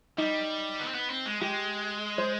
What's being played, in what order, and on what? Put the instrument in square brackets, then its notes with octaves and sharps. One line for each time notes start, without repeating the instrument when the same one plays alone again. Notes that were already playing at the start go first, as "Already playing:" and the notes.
[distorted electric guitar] G3 [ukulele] D#4
[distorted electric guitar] B3
C4
B3
C4
G#3
[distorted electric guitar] G#3 [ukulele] G4
[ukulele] C5